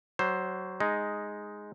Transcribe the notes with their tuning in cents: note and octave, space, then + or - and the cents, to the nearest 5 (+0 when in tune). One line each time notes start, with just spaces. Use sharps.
F#3 +20 C5 +5
G#3 +0 D#4 +0